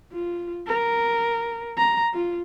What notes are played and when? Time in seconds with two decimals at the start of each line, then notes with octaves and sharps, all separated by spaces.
0.12 F4
0.67 A#4
1.77 A#5
2.14 F4